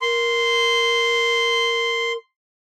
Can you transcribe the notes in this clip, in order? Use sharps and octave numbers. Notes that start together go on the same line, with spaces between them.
A#4 C6